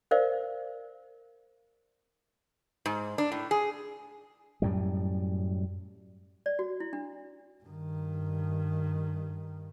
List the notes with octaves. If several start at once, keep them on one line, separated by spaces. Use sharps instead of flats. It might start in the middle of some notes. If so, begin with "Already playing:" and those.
A#4 C5 D5 F5
G#2
D4
A2
G#4
F#2 A2 G3
D5
F#4
E4
D4
G2 D#3